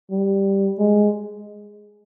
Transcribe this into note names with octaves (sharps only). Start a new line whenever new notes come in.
G3
G#3